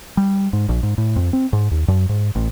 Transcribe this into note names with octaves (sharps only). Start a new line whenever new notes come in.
G3
G#2
A#1
G#2
A2
F2
C4
G#2
D#2
F#2
G#2
A1